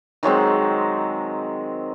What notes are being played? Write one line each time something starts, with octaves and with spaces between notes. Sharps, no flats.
D#3 F#3 G#3 C4